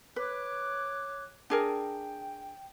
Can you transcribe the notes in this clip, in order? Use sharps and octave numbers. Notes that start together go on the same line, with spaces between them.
B4 C#5 D6 F#6
D4 G#4 A#4 G5